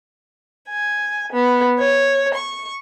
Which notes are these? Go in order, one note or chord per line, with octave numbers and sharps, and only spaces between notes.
G#5
B3
C#5
C#6